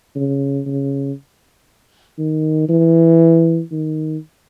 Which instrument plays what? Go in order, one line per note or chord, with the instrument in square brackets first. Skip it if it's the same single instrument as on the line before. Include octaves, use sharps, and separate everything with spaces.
[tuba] C#3
C#3
D#3
E3
D#3